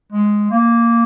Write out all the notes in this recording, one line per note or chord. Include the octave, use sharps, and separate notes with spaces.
G#3
A#3